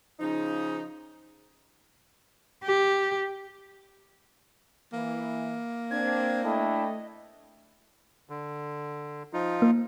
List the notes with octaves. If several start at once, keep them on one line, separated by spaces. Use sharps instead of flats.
C#3 F3 D#4
G4
E3 A#3
C4 D4 G#6
A3 D4 E4 D#5 G5
D3
F3 D#4 F4
A#3